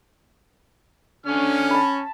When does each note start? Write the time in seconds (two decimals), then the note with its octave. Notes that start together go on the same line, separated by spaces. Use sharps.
1.26 D3 C#4 F6
1.70 A5 B5